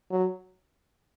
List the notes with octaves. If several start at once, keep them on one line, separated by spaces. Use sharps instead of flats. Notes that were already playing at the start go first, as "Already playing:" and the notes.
F#3